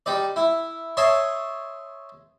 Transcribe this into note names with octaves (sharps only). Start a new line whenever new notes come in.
G3 D#4 D5
E4
C#5 D#5 E5 A5 C6